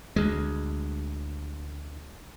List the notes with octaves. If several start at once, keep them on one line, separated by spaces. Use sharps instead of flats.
D2 G#3